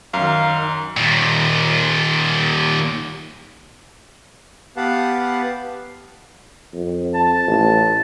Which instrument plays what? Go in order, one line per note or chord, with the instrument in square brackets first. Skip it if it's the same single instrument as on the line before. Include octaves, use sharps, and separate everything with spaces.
[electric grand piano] F#2 [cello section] D#3 [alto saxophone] F5 [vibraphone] A#5
[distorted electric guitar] D#2 A#2
[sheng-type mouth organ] B3 G4 B4 F5 F#5 A5
[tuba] F2
[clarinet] A5
[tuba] A1